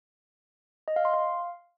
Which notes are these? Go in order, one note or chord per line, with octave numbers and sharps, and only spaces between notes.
D#5
F5
C6
F5